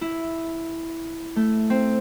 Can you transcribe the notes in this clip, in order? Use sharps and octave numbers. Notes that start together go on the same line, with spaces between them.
E4
A3
C4